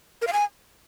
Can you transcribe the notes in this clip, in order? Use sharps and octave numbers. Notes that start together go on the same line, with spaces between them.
A#4
F5
G#5